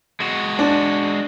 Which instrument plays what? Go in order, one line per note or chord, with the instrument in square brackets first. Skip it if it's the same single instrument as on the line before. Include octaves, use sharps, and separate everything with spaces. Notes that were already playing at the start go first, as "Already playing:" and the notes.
[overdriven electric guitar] G#3 F#4
[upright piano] D4